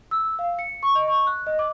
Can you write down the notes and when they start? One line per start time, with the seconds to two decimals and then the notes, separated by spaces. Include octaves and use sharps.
0.11 E6
0.39 F5
0.59 C#7
0.83 C#6
0.95 D#5
1.08 C#6
1.27 F#6
1.47 D#5
1.59 D6